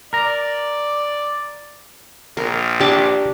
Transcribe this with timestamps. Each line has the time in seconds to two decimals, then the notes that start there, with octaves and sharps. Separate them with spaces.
0.13 A#4 D5 A#5
2.37 A#1 A#4
2.80 D4 G4 A5